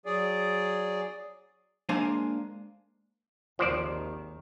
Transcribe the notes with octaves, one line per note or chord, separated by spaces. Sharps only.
F#3 G#4 D5
G#3 A#3 D4 C5 F5 G#5
G#1 D#2 D#3 F3 C5 D5